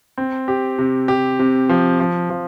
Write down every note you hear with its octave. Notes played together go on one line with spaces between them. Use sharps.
C4
G4
C3
G4
C3
F3
F3
F3